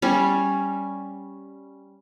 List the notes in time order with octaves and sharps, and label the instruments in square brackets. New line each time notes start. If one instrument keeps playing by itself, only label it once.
[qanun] G3 C#4